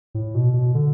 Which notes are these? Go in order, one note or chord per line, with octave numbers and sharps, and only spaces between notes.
A2
B2
B2
D3